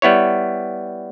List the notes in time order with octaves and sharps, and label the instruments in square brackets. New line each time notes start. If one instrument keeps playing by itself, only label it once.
[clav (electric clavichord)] G3 B3 E4 C#5